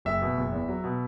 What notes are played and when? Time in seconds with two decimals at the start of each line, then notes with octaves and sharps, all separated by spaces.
0.05 F#1 E5
0.22 B2
0.37 F#1
0.52 E2
0.68 F#3
0.84 B2